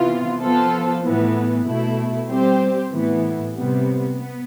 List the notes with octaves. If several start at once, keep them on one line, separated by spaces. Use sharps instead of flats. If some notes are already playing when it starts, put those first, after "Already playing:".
Already playing: C3 E3 B3 F4
F3 B3 F4 A4 C5
A2 E3 B3
B2 A3 E4
G3 C4 G4 C5
A2 E3 B3
C3 G3 B3
B3